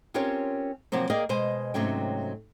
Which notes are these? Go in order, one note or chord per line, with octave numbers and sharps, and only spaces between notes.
C4 C#4 F4 G4 A#4 C#5
C3 F3 F#3 A#3 C4
A#3 G#4 A#4 D5 D#5 G5
B2 G#3 C5 G#5
G#2 C3 F#3 A3 C#4 G5